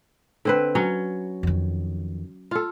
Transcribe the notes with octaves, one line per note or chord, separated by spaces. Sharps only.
D3 C4 B4
F#3 C#4
F2 D#3
F4 A4